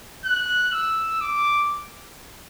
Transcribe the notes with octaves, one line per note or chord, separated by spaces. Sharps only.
F#6
E6
D6